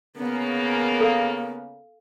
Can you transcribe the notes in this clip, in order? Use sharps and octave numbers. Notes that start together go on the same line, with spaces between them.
C#3 A#3 B3
A4 F5